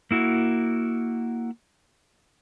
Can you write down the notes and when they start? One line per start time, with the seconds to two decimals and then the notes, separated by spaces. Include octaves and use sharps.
0.11 A#3 E4 F#4